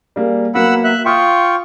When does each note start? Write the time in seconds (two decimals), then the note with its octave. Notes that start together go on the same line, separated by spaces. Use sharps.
0.16 G3 A#3 G#4
0.55 F#3 A#3 B3 F#5 B5 E6
0.84 E5 F#6
1.06 F4 G5 C6 C#6 D#6 F6